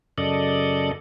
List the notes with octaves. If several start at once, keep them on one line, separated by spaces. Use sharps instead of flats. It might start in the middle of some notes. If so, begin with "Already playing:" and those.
F#2 C#3 A4 D5 D#5